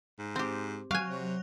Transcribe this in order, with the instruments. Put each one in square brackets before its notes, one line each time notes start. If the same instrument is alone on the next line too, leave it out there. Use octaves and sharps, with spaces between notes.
[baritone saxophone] G#2
[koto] C4 G4
[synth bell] F#3 [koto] F5 G#5
[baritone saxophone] C3